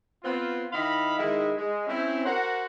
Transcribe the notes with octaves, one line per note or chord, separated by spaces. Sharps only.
B3 C4 F4
D#3 E4 D#5 F5 B5
D#3 G#3 E4
G#3
C4 C#4 E4
F#4 A#4 C5 F#5